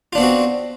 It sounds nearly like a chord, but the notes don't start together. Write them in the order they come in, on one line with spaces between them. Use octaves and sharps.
F4 D4 B3 C4 F#4